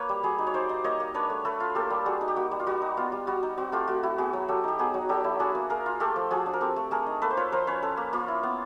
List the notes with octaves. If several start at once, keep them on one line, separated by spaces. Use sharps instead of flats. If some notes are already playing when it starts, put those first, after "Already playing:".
Already playing: A#3 B4 C#5
G3
G3 F#4 G#4
D#4
C#5
D#4 C5 D5
D#4
A#3 C#5 D#5
A#3
D4 B4 C#5
A3
A3 A4 B4
F4
A#3 G4 A4
G3
G3 F#4 G#4
D#4
G4
A#3 F#4
G3
F4
G3 F#4
D#4
B3 F4
G3
G3 F#4
D#4
C4 F#4
A3 F4 G4
A3 F#4
E4 F#4
B3 F#4 G#4
F#3
F#3 G4 A4
D#4 G4
B3 F#4 G#4
F#3
F#3 G4 A4
E4
D4 F#4 G#4
A#3
A#3 G#4 A#4
F4
A3 G4 A4
F3
F3 F#4 G#4
D4
A#4
C4 G4 A4
A3
A3 G#4 A#4
D#4
A#3 A4 B4
C5
F4 B4 C#5
F3 A#4 C5
C#4 B4 C#5
C#4 A4 B4
A#3
A#3 F4
E4
B3